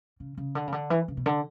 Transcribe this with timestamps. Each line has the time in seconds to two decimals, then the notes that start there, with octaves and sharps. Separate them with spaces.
0.20 C#3
0.37 C#3
0.55 D3
0.67 C#3
0.72 D3
0.90 E3
1.08 C#3
1.17 B2
1.26 D3